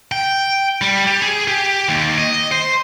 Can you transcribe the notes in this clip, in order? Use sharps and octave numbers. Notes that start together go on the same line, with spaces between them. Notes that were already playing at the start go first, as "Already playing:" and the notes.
G5
G3
G4
G#4
G4
D#2
D#5
C5